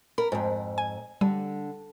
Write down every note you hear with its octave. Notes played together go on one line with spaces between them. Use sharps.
A#4 B5
F2 G#2
G#5
D3 G3